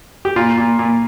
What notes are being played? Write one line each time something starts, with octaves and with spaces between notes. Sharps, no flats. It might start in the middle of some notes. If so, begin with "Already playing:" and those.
G4
A#2 F4
A#2
A#2